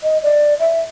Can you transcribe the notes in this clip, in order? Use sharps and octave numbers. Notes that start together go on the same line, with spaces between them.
D#5
D5
E5